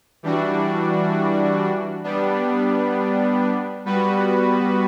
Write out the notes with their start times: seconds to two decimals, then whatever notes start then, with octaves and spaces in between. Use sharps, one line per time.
0.23 E3 G3 D4 F#4
2.04 G3 B3 D4
3.85 G3 B3 F#4 B4